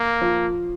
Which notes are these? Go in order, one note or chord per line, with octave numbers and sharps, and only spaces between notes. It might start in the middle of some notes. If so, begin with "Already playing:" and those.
Already playing: A#3
F3